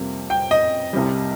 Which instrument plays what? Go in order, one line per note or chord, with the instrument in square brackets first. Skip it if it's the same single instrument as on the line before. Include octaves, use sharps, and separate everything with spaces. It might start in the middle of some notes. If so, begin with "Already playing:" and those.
Already playing: [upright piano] F2 C3 G3 A#3
[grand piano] G5
D#5
[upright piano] C2 C3 G3